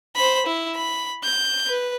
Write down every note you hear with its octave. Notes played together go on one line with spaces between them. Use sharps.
C5 B5
E4
B5
G6
B4